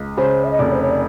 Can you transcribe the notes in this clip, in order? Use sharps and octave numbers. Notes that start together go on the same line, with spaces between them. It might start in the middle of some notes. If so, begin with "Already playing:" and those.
Already playing: C#2
C#3 C5
E5
D#5
F1 D5
C5
C#5
D5